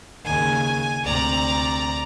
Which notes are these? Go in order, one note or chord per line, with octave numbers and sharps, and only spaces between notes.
D#2 C#3 G#5
D2 C3 D5 A#5